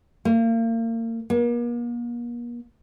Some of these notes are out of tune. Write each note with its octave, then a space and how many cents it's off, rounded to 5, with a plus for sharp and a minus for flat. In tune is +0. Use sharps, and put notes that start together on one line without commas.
A#3 -35
A#3 +40